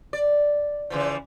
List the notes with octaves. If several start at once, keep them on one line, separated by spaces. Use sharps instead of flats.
D5
C#3 E3 F3